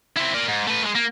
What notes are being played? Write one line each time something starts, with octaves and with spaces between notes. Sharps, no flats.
C4 E4
A#4 D5
G#2
A3 B4
G#3 A3
A#3